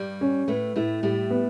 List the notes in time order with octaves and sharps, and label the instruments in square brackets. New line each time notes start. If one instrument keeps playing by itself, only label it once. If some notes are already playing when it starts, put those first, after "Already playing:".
Already playing: [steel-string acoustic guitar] G2 G3
[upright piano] C#4
[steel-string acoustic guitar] A2 A3 [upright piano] B4
[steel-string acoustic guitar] A2 A3 [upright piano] E4
[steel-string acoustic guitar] A2 A3 [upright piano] G3
[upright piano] B3